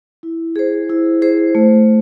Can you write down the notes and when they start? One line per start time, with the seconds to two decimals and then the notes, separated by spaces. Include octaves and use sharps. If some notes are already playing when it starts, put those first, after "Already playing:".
0.23 E4
0.56 G#4 C5
0.89 E4
1.22 G#4 C5
1.55 A3